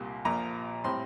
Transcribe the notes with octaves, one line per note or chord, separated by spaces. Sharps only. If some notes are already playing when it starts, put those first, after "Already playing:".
Already playing: C2 A#2 G3 A#3
A#1 A#2 F3 A#5
A2 G3 C4 C6